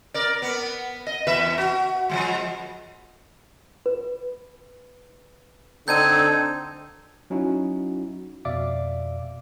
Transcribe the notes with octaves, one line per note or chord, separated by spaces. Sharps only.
A#4 D5
B3
D#5
E2 B4 E5
F#4
F3 F#3 G#3
B4
D3 C4 D#4 A4 G6 G#6 D#7
F#3 C#4 D#4 E4 F#4
F2 B2 D5 E5 F5 D6